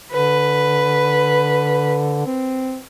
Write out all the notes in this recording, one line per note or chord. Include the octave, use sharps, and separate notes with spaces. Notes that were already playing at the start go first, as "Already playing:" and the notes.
D3 B4
C4